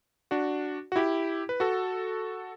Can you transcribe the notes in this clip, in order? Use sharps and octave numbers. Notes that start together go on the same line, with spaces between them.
D4 F#4
F#4
E4 G4
B4
F#4 A4